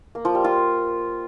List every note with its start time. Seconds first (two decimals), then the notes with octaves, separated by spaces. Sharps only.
0.15 A#3
0.25 F3
0.35 G3
0.44 F4